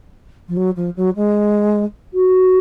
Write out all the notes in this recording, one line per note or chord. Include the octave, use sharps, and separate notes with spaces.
F3
F#3
F3
F#3
G#3
F#4